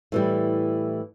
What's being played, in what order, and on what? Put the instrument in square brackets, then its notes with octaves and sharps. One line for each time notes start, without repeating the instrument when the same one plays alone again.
[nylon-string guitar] A2 E3 G3